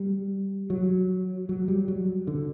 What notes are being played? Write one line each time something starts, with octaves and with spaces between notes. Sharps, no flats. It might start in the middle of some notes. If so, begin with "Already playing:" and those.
Already playing: G3
F#3
F#3
G3
F#3
D3